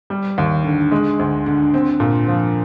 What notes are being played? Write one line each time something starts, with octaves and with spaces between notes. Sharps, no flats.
G3
D#2
D3
G#3
D2
D3
C4
A#2
F3